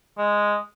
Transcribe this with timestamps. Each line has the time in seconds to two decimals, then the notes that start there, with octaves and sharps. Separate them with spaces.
0.18 G#3